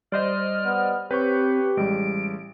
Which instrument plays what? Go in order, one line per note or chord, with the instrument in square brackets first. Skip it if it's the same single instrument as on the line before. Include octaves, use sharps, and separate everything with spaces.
[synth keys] G3 C5 [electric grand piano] D5 D#5 [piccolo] F6
[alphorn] B3
[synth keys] C4 [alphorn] G4 [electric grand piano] B4 C#5 C#6 [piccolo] G6
[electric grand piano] A1 [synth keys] G3 G#3 [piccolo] D7